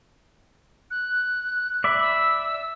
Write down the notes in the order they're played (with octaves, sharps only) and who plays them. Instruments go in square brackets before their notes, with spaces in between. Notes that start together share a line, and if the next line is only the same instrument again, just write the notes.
[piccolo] F#6
[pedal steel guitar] D5 E5 B5
[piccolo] E6